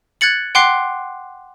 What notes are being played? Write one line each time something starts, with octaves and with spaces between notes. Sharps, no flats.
F#6 G#6 A6 C#7 F#7
F#5 G5 C6 D6 F#6 C7